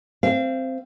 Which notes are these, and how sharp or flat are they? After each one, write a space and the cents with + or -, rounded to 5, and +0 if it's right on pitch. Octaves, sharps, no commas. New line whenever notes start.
C4 +0 F5 -30